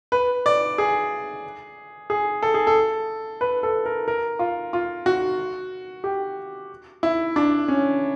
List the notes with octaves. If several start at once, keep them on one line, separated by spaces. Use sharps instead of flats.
B4
D5
G#4
G#4
A4
G#4
A4
B4
A4
A#4
A#4
F4
F4
F#4
G4
E4
D4
C#4